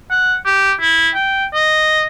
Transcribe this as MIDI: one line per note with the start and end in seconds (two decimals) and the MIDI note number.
0.11 0.36 78
0.45 0.73 67
0.81 1.09 64
1.15 1.45 79
1.54 2.07 75